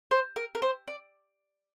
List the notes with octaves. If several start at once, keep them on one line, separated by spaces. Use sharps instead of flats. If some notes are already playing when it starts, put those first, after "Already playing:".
C5
A#4
A#4
C5
D5